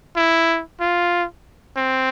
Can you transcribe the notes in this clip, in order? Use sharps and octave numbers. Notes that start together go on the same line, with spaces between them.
E4
F4
C4